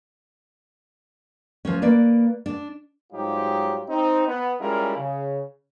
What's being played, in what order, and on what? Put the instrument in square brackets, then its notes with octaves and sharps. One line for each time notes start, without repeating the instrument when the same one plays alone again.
[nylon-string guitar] F3 A3 C#4
A#3 B4 D5
D4
[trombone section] G#2 F#3 G3 D#4 F4 G4
C4 D#4
B3
G3 G#3 C#4 E4 F4 A#4
C#3